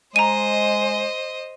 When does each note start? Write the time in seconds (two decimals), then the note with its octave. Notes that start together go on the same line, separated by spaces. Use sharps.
0.16 G#3 C5 D#5 A#5 D#7